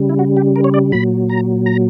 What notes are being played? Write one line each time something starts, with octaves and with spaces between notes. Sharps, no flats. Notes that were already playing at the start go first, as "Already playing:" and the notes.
Already playing: C#3 G3
E4
F#4
G4
A#4
C#5
D5
A#2 F#3 B5
A#5
A#5